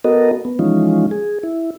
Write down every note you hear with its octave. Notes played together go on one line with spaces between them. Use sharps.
B3 F#4 A4 A#4 D#5
B3
E3 F3 G#3 C#4 D#4 F4
G#4
E4